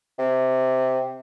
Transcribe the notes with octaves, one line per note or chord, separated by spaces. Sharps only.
C3